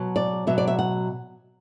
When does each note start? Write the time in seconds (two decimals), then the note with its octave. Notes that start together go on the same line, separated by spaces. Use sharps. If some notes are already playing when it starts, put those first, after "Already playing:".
Already playing: B2 F#3
0.16 D5
0.47 B2 F#3 E5
0.58 D5
0.68 E5
0.79 F#5